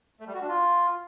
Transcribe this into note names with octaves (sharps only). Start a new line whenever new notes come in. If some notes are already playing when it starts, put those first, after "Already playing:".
A3
G3
F#4
D4
F4